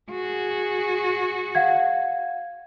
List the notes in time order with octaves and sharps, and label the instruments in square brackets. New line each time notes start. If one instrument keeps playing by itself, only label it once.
[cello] F#4 G#4
[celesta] F5 F#5 G#6